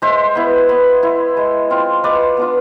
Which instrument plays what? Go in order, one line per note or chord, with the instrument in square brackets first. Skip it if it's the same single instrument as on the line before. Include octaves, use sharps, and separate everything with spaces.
[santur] G#3 C5 E5
B3 E4
B3
E4
G#3
C4 F4
G#3 B4 D5
B3 D4 F4